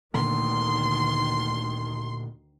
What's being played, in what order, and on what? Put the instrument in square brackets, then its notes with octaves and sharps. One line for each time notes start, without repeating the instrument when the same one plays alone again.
[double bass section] D2 D#3 [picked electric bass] A#2 D3 A3 [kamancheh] C6